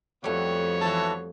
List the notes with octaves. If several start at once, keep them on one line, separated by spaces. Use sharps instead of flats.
F2 G3 A3 B3 F#4 C#5
E3 A4